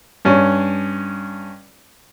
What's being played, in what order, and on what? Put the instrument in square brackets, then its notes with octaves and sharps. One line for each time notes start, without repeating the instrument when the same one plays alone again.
[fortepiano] G2 C#4